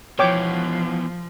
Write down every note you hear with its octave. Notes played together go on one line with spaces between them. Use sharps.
B2 E3 F3 C#5 G5 D6